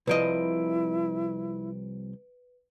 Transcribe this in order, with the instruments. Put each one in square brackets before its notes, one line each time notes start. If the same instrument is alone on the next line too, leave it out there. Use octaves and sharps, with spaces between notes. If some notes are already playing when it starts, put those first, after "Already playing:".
[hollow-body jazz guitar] C2 F3 D#5 [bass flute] E4 [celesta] B4 D7